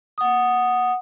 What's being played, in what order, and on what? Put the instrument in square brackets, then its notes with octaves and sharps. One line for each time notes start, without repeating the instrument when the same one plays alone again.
[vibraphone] F#5 D#6